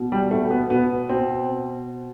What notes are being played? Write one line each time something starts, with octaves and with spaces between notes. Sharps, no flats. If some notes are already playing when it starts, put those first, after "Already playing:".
Already playing: B2
G3
B2 A3
B3
B2 B3
B2 C4